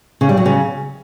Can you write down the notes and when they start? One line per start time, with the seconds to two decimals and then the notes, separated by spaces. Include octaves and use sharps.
0.21 C#3
0.29 G3
0.37 F#3
0.46 C#3